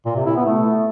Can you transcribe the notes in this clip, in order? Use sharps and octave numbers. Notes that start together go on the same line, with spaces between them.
A#2
C3
E4
B3
A3